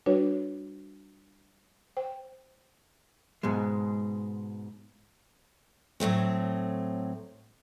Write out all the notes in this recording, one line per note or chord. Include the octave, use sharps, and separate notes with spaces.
G3 D4 F#4 B4 C#5
C5 G5
G#2 B2 G#3
A2 F#3 A3 C4